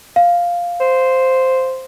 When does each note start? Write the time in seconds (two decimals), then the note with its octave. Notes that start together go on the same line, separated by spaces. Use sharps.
0.16 F5
0.80 C5